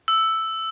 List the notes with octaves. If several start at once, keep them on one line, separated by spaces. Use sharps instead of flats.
E6